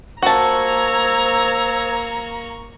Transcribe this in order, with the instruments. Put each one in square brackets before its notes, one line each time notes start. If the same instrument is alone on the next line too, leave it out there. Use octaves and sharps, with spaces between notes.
[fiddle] A#3 C#6 [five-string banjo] F#4 A5 [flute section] C5 E6 G#6 [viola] A#5